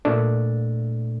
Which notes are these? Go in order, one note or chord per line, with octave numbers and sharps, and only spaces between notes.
A#2 A3 D4